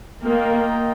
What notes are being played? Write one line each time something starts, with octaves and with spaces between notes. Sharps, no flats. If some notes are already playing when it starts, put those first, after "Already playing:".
A#3 F4 A#4 D#5 G5